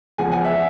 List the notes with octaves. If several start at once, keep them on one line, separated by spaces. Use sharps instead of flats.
E2 C#3 F3 F#5 G#5
F#5 G#5
E5 F#5